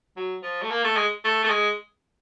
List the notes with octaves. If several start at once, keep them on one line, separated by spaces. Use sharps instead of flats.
F#3
F3
A3
A#3
A3
G#3
A3
A3
G#3